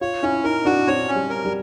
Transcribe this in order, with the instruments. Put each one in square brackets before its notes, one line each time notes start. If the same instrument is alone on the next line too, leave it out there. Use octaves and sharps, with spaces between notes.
[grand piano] F4 [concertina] C#5
[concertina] C#4 [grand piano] E4
[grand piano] D#4 [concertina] A#4
[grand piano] D4 [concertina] F#4
[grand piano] C4 [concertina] C#5
[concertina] C#4
[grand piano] G3
[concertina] A#4
[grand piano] G3